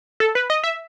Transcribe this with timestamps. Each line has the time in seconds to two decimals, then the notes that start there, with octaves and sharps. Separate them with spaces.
0.20 A4
0.35 B4
0.50 D#5
0.64 E5